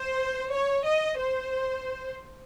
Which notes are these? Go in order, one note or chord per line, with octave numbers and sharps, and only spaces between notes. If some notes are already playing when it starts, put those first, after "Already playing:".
Already playing: C5
C#5
D#5
C5